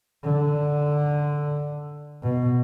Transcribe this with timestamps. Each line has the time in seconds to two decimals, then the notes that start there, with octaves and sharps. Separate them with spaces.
0.24 D3
2.23 B2